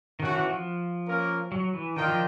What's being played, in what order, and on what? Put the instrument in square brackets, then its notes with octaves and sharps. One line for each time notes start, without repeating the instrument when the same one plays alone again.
[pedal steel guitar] D#3 [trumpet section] A3 C#4 F#4
[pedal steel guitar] E3
F3
[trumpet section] A#3 C#4 F4 A#4
[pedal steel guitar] F#3
E3
[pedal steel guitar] D#3 [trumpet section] D4 F4 A#4 D#5 G5
[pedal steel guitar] F3